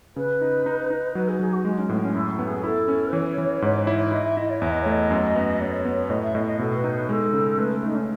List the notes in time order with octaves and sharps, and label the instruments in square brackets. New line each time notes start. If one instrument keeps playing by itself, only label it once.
[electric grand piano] C#3 [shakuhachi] B4
[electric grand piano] D#4
D#4
D#4
[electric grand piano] F#3 [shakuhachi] B4
[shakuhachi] G#4
[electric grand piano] F#3 [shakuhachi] G#4
[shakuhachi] F#4
[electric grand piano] G#3 [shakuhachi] D#4
[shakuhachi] C#4
[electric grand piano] A2 [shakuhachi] B3
[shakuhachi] C#4
[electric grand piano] F#2 [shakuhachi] E4
[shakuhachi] E4
[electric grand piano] B3
[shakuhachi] G#4
[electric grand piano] E4 [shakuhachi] A4
[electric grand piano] C#4
[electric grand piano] E3 [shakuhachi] C#5
[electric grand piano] E3
G#2
E4
[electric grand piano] E4 [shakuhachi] D#5
[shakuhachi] E5
[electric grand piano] E4 [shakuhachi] D#5
[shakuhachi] C#5
[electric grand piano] E2 [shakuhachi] E5
[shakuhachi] D#5
[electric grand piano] A3 [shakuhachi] C#5
[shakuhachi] D#5
[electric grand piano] F#2
B3
[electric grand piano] B3 [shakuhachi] C#5
[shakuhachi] C#5
[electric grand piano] B3
[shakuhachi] C#5
[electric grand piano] A2 [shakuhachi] D#5
[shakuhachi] E5
[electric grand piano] A2 [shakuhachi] D#5
[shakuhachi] D#5
[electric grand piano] B2 [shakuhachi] A4
[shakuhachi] B4
[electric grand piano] D#4
[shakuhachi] B4
[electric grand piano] G#3 [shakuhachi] A4
[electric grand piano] C#3
[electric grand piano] A3 [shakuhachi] B4
[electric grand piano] A3 [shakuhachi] D#4
[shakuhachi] C#4